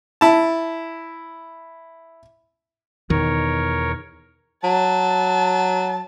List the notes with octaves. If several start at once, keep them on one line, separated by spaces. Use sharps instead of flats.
E4 A5
E2 B2 D#3 A#4 C#5
F#3 A5